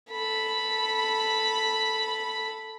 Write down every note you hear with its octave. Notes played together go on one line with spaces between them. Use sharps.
A4 B5